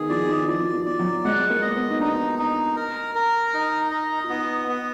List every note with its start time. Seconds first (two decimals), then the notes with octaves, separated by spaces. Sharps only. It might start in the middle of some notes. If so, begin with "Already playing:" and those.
Already playing: D#3 B3 G#4
0.09 F3 D5
0.29 D#3
0.48 F3 D5
0.73 F3
0.86 D5
0.99 F#3
1.25 G#3 F#5
1.50 A#3
1.62 D#5
1.76 B3
1.90 D#4
2.00 D4 D#4
2.39 D#4
2.76 A#4
3.15 A#4
3.54 D#4
3.91 D#5
4.24 F4
4.30 B3 D#4
4.68 B3